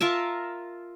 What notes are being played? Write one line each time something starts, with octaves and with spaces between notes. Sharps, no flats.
F4 A#4 E5 A5